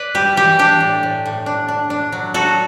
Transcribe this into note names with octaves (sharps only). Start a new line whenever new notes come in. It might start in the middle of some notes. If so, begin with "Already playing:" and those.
Already playing: B4 D5
G3 G4
E3 G4
D4 G4
A2
A2
A2
D4
D4
D4
F#3
F#3 F#4 A4